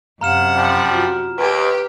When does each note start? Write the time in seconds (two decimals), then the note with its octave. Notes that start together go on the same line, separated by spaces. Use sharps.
0.21 F#2 C3 F5 F#5 A#5 F6 E7
0.56 F3 G3
0.90 F4 F#4
1.38 D#2 G4 B4